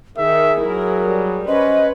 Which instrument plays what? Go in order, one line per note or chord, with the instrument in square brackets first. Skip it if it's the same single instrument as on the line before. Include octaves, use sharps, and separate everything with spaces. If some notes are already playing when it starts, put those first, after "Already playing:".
[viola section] D#3 [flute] G#4 [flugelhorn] E5
[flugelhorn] F#3 [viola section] E4 A#4
[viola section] G3
[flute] C#4 [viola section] B4 [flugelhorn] C5 [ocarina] D#5